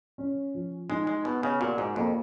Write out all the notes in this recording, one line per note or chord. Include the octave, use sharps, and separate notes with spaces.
C#4
F3
G#3 D#4
G#3
B2 B3
C#3
A#2 F#4
G#2
F2 A#3